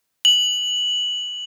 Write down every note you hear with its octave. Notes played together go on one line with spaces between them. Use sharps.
F#7